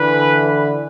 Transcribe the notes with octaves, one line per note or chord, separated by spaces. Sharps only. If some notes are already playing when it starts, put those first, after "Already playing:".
Already playing: D3 E3 B4